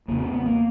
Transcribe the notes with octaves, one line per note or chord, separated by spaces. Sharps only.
E2 C#3 A#3
B3
B3
A#3